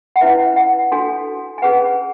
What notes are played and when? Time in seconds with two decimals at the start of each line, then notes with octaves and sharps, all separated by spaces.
0.16 F#5
0.21 C#4 E4 B4 E5
0.56 F#5
0.92 D4 F#4 A4 G#5
1.58 G#5
1.62 C#4 G#4 B4 F#5